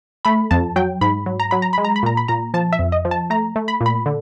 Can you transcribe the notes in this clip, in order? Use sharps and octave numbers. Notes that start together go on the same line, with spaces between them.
A3 B5
F2 A5
F#3 G5
G#2 B5
F#3
A#5
F#3 B5
A#5
G#3 B5
A#5
B5
A#2 A#5
B5
A#2 A#5
F3 A5
E5
F2
D#5
F3
A5
A3 A#5
A3
B5
A#2
B5
D3